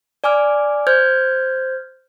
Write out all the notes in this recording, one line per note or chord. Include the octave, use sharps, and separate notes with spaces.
D5 G#5 D6 F6
C5 F6 G6 G#6